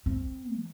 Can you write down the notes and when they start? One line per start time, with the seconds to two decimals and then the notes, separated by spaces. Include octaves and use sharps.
0.06 C4
0.57 E3